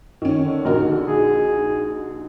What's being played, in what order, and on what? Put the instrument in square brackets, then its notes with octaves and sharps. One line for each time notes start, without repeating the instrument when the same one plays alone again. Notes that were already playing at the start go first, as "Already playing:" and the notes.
[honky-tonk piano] D#3 C#4
[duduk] D3
[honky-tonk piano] A#1 D#4 F#4 [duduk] A#4
[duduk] D3
G#4